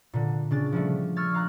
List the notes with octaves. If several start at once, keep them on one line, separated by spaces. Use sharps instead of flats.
A#2 D3
C#3 D4 A6
F3 G3 A3
C#6 E6 F6 G#6 A6
F5 A#5 F#6